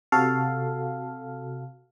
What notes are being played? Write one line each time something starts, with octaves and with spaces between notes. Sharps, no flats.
C3 F#4 A4 F5